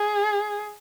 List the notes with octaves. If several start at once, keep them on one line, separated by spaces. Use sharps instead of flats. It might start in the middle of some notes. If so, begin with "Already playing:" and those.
Already playing: G#4